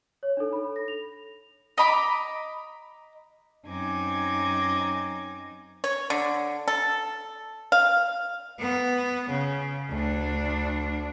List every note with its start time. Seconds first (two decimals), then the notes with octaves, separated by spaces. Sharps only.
0.23 C#5
0.37 D4 D#4 A4
0.53 A4 B5
0.76 A#6
0.88 F7
1.78 D#5 A#5 B5 D6
3.66 F#2 C4 D#4 G#5 D6 G#6
5.84 C#5
6.10 D3
6.68 A4
7.72 F5
8.60 B3
9.29 C#3
9.90 D2 D4